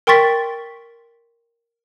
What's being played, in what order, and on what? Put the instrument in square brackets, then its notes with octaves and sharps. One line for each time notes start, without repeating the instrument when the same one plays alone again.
[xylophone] A#4 G5 C6 C#6 A6 B6